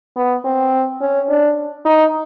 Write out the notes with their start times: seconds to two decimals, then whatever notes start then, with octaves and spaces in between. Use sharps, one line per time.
0.16 B3
0.45 C4
1.01 C#4
1.29 D4
1.85 D#4